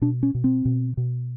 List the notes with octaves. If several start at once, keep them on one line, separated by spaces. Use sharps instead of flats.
B2 D4
C#4
B2
C4
B2
B2